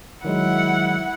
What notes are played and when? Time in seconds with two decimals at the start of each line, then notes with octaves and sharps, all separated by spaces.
0.25 D#3 F#3 G#3 E4 F#5